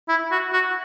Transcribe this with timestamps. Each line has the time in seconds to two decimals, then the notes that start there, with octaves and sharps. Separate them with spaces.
0.09 E4
0.31 F#4
0.53 F#4